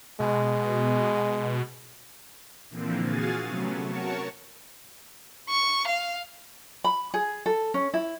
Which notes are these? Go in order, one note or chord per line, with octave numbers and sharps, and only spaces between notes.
B2 G#3
A#2 D3 E3 F3 A#3 C4
F#4 G#4 F5 G#5 A6
C3 F#3 A3 B3 C#4
F#4 A#4 C#5 A5 C#6
C#6
F5
B5
G#4
A4
C#4
E4